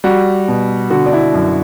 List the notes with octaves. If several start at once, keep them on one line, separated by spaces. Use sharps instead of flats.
G3 F#4
B2
D3 F#4
D4
E4
F#2